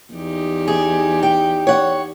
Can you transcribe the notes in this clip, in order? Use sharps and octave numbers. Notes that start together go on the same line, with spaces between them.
E2 D#4 G4
G#4
G5
C#5 F#5